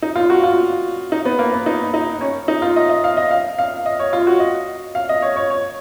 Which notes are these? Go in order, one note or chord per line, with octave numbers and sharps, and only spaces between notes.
D#4
F4
F#4
F4
D#4
B3
A#3
B3
D#4
D#4
C#4
D#4
F4
D#5
D#5
F5
D#5
F5
F5
D#5
C#5
F4
F#4
D#5
F5
D#5
C#5
C#5
C#5